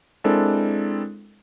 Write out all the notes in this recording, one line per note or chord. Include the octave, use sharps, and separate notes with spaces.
G#3 C4 D4 E4 A4 A#4